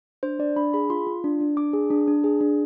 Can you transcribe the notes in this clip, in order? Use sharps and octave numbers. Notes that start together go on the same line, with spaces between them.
D4 C5
D4 D5
D4 B5
G#4 B5
F4 C6
F4
D4
D4
D4 D6
G#4
D4
D4
G#4
D4